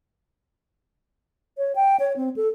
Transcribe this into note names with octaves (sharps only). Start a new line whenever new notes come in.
C#5
G5
C#5
C4
A4